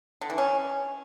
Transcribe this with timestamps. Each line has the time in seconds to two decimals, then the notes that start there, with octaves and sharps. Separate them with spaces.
0.21 D3
0.30 E3
0.38 C#4